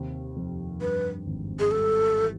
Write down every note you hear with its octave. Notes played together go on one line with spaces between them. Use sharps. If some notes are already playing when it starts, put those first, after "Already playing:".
Already playing: D#2 C3
F2
G2 B4
G#1
G#4
G3 A4
E3